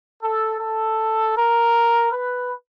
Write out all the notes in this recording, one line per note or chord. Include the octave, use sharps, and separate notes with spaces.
A4
A4
A#4
B4